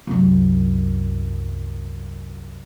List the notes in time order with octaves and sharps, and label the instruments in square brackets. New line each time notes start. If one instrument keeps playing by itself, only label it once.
[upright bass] C2 F#2